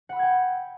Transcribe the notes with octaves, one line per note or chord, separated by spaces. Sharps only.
F#5 G5 B5 E6 G#6